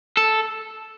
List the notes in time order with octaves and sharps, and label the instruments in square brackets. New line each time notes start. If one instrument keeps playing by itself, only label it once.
[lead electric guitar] A4